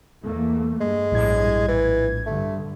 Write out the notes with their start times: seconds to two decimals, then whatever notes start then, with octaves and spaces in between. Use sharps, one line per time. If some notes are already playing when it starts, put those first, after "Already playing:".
0.23 E2 A3 A#3
0.81 G2 G#3
1.12 A#1 A2 G#6
1.68 E3
2.26 G2 D3 A3